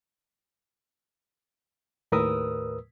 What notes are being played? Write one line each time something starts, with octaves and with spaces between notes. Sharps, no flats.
D#2 A2 A#4 B4 D#6 E6